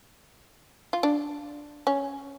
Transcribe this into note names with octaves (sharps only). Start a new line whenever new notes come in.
F4
D4
C#4